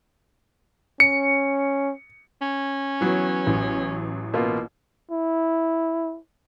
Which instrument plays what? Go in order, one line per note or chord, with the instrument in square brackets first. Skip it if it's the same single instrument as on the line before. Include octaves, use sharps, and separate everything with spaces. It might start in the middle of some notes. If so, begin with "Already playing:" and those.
[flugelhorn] C#4 [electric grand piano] C#7
[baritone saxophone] C#4
[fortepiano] E3 F#3 B3
[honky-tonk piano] A1
[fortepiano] B2 A#3 F4
[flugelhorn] E4